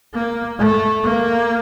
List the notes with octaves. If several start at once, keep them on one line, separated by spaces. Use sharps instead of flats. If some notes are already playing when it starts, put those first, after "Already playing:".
A#3
A3
A#3